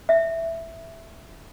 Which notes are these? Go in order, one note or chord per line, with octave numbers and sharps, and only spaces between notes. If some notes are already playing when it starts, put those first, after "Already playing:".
E5